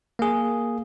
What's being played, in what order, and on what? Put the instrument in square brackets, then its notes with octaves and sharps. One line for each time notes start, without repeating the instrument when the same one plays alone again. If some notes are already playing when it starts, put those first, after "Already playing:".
[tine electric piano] A#3 G#4